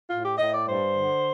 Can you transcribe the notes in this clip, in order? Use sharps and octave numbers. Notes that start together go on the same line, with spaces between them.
A2 F4
G4
A2 D#5
D5
G2 C5
D3